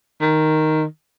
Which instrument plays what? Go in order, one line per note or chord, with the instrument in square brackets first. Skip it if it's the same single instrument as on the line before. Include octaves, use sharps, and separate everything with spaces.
[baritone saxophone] D#3